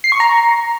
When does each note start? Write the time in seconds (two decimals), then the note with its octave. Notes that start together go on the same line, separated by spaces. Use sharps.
0.04 C7
0.12 C#6
0.20 A#5